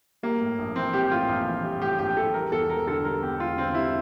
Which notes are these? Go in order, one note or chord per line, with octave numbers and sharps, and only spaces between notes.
G3 A#3
A2
A#1
E3 C4
G3 G4
A2 F4
A#1
E3
G3
A2 G4
A#1 G4
E3 A4
G3 A#4
E2 A4
E1 A#4
D3 A4
G3 A#4
E2 G4
E1 F4
D3 C4
G3 E4